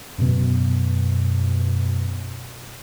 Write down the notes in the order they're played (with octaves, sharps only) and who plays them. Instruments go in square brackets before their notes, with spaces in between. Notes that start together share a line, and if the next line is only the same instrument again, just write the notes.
[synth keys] F#2 B2